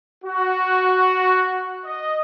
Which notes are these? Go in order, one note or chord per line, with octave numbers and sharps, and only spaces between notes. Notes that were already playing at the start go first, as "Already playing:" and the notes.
F#4
D#5